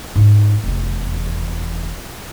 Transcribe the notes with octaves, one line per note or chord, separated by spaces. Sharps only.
G#2 D#4
F1 E2